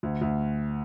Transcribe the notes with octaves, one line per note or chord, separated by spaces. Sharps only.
D2
D2